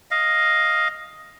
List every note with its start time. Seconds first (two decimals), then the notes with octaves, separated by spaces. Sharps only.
0.11 D#5 F5